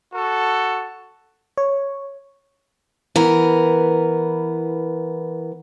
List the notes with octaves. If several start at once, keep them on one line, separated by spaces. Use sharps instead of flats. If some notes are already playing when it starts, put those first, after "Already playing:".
F#4 A4
C#5
E3 B3 A#4